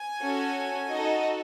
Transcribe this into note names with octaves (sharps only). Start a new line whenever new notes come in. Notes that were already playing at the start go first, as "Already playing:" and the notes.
Already playing: G#5
C#4 F#4 A4
D#4 F#4 A4 D#5